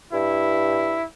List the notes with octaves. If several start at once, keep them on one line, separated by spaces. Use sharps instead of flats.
G2 E4